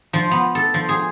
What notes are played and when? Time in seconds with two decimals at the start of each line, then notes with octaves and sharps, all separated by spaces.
0.13 F3
0.31 B3
0.55 A4
0.74 F3
0.89 G#4